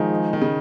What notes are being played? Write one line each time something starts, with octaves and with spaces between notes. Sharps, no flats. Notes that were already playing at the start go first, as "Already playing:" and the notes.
Already playing: D#3 F3 G#3 D#4 G#4
D#3
C#3